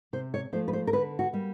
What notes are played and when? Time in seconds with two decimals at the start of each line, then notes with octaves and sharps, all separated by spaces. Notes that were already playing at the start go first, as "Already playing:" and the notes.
0.13 C3 C5
0.34 C#5
0.53 F3 A3 C5
0.68 B4
0.73 C5
0.87 A#4
0.93 D3 B4
1.19 F#4
1.33 G3 A#3